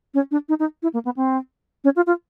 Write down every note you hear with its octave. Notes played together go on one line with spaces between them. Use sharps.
C#4
D4
D#4
D#4
E4
A#3
B3
C4
C#4
F4
F4